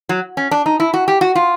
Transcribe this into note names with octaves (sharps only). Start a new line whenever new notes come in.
F#3
C#4
D4
D#4
E4
F#4
G4
F#4
F4